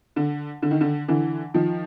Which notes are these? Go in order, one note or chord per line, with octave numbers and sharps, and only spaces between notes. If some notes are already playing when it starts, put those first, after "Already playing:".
D3
D3
D#3
D3
D3 E3
D#3 F3